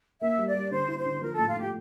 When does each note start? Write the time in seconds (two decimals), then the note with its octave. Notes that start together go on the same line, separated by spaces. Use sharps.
0.21 A#3 E5
0.38 G3
0.47 D5
0.54 G3
0.71 D3 C5
0.88 E4
0.97 C5
1.05 D3
1.22 F3 A#4
1.34 A2 A4
1.48 F4
1.57 A2 G4